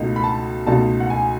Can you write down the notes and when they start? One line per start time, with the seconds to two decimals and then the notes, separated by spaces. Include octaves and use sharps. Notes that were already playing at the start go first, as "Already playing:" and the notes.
Already playing: C#2 B2 A3 D#4
0.16 B5
0.24 A5
0.66 C#2 B2 A3 D#4 A5
1.00 F#5
1.10 G#5